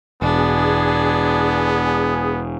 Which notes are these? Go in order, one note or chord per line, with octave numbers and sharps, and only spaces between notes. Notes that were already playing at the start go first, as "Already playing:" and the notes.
E1 B3 D4 G#4